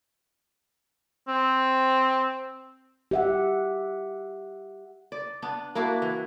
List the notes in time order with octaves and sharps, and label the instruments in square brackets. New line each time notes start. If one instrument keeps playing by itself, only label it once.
[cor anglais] C4
[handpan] G4 E5 F#5
[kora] D5
B3 D4
A#3 D4 E4 F#4
E3